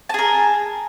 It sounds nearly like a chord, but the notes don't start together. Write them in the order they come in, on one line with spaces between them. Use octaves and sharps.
A5 G#4 A#4